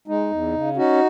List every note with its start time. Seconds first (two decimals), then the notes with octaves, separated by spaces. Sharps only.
0.08 G#3 D#4
0.31 E2
0.54 C#3
0.76 C#4 D#4 F#4